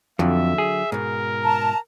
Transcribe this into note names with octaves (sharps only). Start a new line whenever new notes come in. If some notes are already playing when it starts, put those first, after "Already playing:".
F2 D3 F#3 E5
G#4
G#2 B2 A#4
A5 A#5